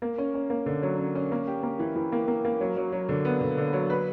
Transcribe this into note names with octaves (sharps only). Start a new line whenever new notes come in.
A#3
C#4
C#4
A#3
D3
F#3
C#4
C#4
A#3
G4
A#3
E3
E3
A#3
A#3
A#3
F#3
F#3
F#3
D3
B3
D3
D3
F#3
B4